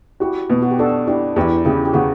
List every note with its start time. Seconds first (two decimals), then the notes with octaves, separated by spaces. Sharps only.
0.20 E4 F#4 G4
0.50 B2
0.62 F#4
0.71 G4
0.79 D4 F#4 A4
1.07 D4 E4 G4
1.36 E2 E4 G4
1.65 C#3 E4 G4
1.85 G4
1.93 C#3 F#4